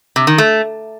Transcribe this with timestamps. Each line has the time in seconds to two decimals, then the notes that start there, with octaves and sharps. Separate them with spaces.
0.16 C3
0.27 D#3
0.38 A3